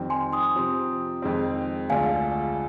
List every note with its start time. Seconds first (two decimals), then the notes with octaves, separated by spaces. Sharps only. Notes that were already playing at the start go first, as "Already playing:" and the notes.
Already playing: F2 D#3 G3 C4
0.10 G#5 C6
0.32 C6 D#6
0.56 C3 F3 C4
1.22 F2 D#3 G#3 C4
1.90 D2 D3 G#3 D4 F4 F5 G#5